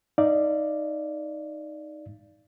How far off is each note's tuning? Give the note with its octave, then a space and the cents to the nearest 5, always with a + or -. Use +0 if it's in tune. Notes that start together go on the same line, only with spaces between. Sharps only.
D#4 +0 D5 +0 F5 -30